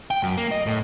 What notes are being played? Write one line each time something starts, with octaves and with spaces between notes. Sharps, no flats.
G5
F#2
A#3
D#5
A2